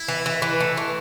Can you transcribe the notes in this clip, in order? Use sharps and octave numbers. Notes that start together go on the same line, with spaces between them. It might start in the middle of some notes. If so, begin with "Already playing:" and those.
Already playing: E4
E3
E3
E3
A3
E3